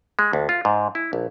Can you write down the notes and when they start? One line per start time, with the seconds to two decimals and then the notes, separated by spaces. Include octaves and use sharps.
0.19 G#3
0.33 D2
0.49 F4
0.65 G#2
0.95 E4
1.13 A#1